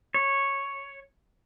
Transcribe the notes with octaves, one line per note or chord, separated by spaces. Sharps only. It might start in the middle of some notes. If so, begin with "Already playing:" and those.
C#5